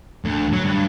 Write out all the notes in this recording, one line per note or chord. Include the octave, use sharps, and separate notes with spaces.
D2
F#3
G2